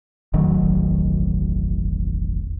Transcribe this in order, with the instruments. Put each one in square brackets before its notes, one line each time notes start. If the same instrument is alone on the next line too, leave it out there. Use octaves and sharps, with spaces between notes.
[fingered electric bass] E1 A1 D#3 F#3